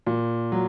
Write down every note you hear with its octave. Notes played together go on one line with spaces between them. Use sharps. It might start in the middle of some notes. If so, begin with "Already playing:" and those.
A#2
F#3